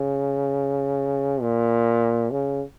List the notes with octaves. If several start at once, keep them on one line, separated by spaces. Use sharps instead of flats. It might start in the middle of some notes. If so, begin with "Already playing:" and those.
Already playing: C#3
A#2
C#3